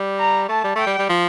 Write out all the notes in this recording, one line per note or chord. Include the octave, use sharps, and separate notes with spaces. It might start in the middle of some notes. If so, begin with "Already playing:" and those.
Already playing: G3
A#5
A3 A5
G3
A3 G5
G3
G3
F3